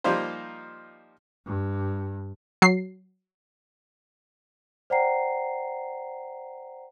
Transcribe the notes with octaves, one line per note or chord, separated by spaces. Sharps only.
F3 G3 A#3 D#4 F4 C5
G2
F#3 C7
C5 D5 F#5 G5 A#5 C7